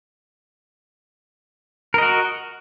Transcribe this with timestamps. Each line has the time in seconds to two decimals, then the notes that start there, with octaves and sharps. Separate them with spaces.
1.94 A#4
1.98 D#5
2.02 F#4